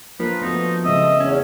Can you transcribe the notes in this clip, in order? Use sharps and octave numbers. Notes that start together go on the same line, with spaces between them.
F3 A#3 D4 A#4 B4
A3 B3 D#4 F#4
C#3 G#3 C4 D#5 E5
E2 C#4